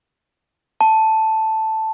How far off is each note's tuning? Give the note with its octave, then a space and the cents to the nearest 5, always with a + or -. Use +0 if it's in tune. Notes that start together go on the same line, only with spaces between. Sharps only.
A5 +0